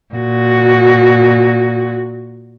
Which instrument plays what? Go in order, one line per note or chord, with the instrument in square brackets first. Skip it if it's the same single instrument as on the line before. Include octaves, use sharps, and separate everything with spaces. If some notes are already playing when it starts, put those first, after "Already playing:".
[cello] A#2 F#4